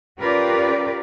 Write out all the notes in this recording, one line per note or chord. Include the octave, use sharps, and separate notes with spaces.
C#4 F4 G4 A#4 B4 D5